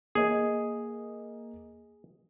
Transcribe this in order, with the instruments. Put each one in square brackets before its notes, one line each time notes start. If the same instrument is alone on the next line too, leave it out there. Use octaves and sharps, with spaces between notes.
[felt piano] A#3 D#5 [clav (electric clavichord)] G#4